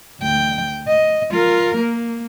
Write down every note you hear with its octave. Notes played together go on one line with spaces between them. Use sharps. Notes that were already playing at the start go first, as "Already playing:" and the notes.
D2 G5
D#5
F4 A#4
A#3